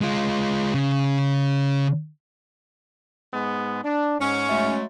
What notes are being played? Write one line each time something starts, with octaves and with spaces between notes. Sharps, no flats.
G#3 F4
C#3
G#2 G#3 B3
D4
G#2 C#4
F#3 G#3 A3